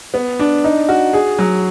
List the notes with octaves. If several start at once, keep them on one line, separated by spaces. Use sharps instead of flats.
B3
D4
D#4
F#4
G#4
F#3